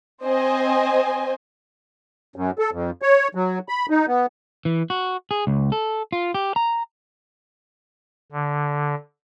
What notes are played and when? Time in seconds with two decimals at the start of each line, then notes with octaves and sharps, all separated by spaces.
0.23 C4 C5 D#5 G#5
2.36 F#2
2.59 A4
2.72 F2
3.02 C#5
3.35 F#3
3.69 B5
3.90 D#4
4.08 B3
4.65 E3
4.90 F#4
5.31 G#4
5.47 C#2
5.72 A4
6.13 F4
6.34 G4
6.56 A#5
8.32 D3